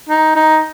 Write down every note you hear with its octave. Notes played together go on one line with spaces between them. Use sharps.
D#4
D#4